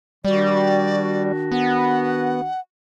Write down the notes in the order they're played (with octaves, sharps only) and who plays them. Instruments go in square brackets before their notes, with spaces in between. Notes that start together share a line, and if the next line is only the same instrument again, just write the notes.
[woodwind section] D#3 D4 F#4 [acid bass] G3 [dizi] D5
[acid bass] B3 [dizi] F#5